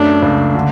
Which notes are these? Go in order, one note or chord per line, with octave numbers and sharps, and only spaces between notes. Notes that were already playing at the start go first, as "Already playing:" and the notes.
Already playing: F#2 A3 D4
C#2
D3